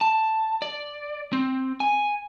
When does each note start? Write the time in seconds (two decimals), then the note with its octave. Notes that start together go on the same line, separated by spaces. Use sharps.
0.01 A5
0.62 D5
1.33 C4
1.80 G#5